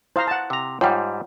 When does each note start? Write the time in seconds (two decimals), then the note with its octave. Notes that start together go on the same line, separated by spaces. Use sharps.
0.16 E4 C5 F5 A#5 D#6
0.27 F#5 A5
0.50 C3 A#5
0.81 G#2 G3 F4 C#5 F#5 G5